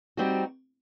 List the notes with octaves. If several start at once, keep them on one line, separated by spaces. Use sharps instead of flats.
G3 C4 D#4 F#4